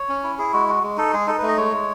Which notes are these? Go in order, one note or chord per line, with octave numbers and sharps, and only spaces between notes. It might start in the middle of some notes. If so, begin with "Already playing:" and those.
Already playing: C#5
C#4
E4
E4 G#4
G#3 F#4
F#4
G#3
D#4 A4
G#3 G#4
D#4 A4
B4
A3
D#5
G#3 C#5
G#3